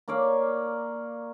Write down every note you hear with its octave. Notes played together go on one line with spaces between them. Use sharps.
A#3 C#5 D5 F5